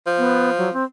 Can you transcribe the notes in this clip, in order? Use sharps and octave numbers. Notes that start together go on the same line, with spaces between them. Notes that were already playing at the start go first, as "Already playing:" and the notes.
F3
B3
F#3
C4